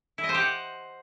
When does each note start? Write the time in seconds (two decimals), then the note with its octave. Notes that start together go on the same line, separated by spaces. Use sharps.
0.18 E4
0.24 D#5
0.29 C5
0.34 G4
0.40 F#5